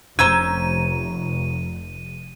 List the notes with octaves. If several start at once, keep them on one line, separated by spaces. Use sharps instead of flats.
F1 C#4 C5 A#5 E6 G#6 D#7